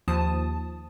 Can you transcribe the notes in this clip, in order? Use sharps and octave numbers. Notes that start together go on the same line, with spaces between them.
D#2 F3 A5 D#6